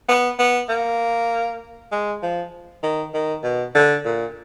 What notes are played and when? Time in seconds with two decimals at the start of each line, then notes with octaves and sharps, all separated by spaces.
0.08 B3
0.39 B3
0.69 A#3
1.92 G#3
2.22 F3
2.83 D#3
3.14 D#3
3.43 B2
3.75 D3
4.05 A#2